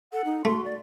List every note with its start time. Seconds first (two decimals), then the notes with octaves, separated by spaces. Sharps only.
0.13 A4 F#5
0.25 D#4
0.45 A3 F#4 C6
0.65 D5